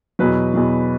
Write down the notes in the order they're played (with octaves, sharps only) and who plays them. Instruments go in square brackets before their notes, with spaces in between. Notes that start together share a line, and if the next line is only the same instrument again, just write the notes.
[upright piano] E2 B2 F#3 B4
E2 B2 F#3